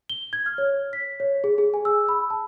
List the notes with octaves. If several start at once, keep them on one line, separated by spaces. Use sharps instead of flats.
G7
G#6
F6
C#5
B6
C#5
G#4
G#4
G#5
E6
B5
A5